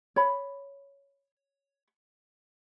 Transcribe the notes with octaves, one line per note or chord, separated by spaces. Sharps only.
C#5 B5